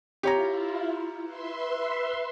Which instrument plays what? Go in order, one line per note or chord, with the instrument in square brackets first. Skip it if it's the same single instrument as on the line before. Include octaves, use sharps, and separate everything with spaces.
[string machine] E4 F4 [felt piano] G4 C#5 A#5
[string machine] B4 E5 C6